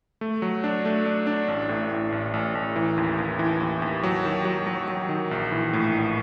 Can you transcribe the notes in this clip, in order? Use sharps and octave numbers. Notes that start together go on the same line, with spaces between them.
A3
F#3
D4
A3
D4
D4
A1
A2
A2
A1
A1
A1
E3
D#2
D#2
E3
D#2
D#2
F#3
D#3
F#3
F#3
F#3
D#3
A#1
E3
A2
A#1